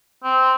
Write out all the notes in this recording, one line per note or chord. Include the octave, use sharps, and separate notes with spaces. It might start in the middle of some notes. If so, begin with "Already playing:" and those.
C4